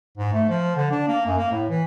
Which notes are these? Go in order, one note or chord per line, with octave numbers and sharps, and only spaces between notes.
G#2
A3
F3
D3
D4
A#3
F#2
A#3
A2
E3